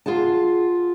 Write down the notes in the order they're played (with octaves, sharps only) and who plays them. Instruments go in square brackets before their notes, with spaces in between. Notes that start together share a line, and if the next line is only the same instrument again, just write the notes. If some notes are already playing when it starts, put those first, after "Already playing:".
[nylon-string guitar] F4 G#4 F#5 A5